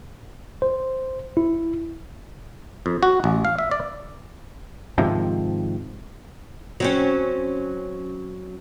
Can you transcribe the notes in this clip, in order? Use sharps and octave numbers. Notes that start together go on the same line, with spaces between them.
C5
E4
F2
F#4
A1
F5
E5
D5
G#2 C3 D#3 F3
F#3 C4 C#4